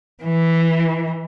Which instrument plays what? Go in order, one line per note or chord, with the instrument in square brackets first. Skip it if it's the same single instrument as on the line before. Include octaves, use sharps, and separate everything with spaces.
[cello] E3